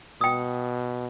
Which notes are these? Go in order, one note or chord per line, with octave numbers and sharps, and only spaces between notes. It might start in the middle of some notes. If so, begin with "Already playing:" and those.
B2 G5 D#6